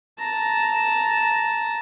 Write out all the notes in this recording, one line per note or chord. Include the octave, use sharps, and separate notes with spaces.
A5 A#5